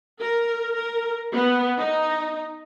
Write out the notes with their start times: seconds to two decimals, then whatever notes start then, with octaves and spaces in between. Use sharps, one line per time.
0.20 A#4
0.76 A#4
1.33 B3
1.78 D#4